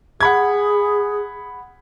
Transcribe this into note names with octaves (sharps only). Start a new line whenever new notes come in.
G#4 F#5 B5 G#6